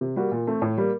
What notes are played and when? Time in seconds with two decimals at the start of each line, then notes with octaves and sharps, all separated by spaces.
0.01 C3
0.16 G3 A#3 F#4
0.32 A#2
0.47 A3 C4
0.62 A2
0.78 G3 A#3